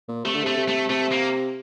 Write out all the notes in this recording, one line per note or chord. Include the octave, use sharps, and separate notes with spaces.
A#2
C3 A3
D3
C3 A3
C3
A3
C3 A3
A#3